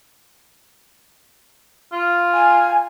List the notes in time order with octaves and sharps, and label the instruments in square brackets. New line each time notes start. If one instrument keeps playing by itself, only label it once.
[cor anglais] F4
[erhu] G#5